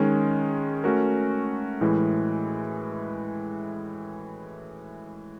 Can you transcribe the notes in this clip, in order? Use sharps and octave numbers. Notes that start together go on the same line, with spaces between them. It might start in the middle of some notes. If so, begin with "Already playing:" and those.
Already playing: D#3 G#3 C#4
A3 C#4 F#4 A#4
A2 E3 G#3